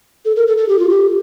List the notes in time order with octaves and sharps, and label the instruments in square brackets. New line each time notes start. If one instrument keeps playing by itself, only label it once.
[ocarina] A4
A#4
A4
A4
G4
F4
G4